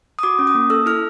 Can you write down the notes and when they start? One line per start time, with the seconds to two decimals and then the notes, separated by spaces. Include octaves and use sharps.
0.19 D#6
0.23 F#4 D6
0.39 C#4
0.47 D#6
0.55 A#3
0.70 A4 E6
0.86 E4 F6